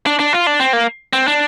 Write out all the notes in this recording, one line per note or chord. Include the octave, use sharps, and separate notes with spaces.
D4
D4
F4
D4
C4
A#3
C4
D4